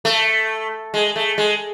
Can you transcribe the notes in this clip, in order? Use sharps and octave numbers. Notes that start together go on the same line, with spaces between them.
A3
G#3
A3
G#3